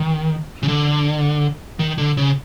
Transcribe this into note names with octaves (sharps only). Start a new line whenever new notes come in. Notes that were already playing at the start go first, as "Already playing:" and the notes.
Already playing: D#3
C#3
D3
D#3
D3
C#3